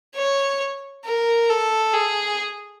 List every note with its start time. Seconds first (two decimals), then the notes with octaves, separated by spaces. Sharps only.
0.15 C#5
1.05 A#4
1.49 A4
1.94 G#4